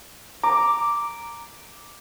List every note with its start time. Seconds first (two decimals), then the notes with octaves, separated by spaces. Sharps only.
0.44 A#5 D6